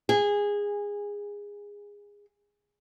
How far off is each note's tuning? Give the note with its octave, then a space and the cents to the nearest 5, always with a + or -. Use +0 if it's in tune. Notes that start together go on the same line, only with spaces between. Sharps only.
G#4 -20